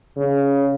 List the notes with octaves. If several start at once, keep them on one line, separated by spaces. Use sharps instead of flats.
C#3